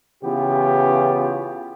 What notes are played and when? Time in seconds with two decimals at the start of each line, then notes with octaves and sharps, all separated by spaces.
0.22 C#3 E3 B3 F4 G4